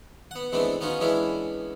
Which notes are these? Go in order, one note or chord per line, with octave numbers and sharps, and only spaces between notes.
B3 F#5
E3 G#3 A3 B3 C4 D4
B3 C#4 D#4 F4 F#4
E3 G#3 B3 C#4 D4 E4